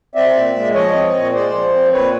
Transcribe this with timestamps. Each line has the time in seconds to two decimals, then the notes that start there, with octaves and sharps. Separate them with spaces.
0.15 C4 D5 E5
0.35 A#2
0.55 G#3
0.74 F3 C#5 D#5
0.94 C4
1.14 A#2
1.34 G#3 C5 D5
1.54 F3
1.74 C4
1.93 A#2 B4 C#5